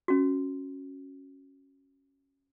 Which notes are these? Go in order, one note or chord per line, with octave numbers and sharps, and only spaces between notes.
C#4 F#4